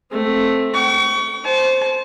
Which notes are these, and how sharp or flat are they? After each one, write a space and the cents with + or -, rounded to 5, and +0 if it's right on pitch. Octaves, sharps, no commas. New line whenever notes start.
A3 +0 C4 +5
G5 -40 C#6 +25
C5 +0 A5 -30